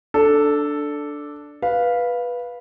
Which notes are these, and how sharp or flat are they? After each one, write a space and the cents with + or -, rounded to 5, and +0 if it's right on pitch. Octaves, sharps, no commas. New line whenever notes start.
D4 +0 A4 +0
B4 -10 F5 +0